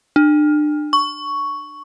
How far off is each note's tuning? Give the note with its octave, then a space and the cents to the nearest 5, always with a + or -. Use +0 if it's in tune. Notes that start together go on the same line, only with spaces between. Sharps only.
D4 +35
C#6 +5